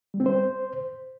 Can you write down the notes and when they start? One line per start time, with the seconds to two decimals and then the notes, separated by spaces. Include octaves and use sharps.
0.14 G3
0.20 C4
0.26 C5